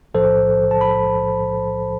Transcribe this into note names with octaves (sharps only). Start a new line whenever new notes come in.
B1 A2 F3 A4 C5
A5
B5